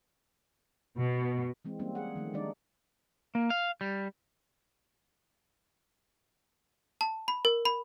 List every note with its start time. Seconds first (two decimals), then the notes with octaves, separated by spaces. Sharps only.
0.98 B2
1.65 E3 G#3 C4
1.79 G3 A#3 C4 C#4
1.95 G#4 F#5
2.16 D#3 F3 A3
2.34 D#3 G3 G#3 D4 D#4 D5
3.35 A#3
3.50 F5
3.81 G3
7.01 A5
7.28 B5
7.45 A#4
7.65 B5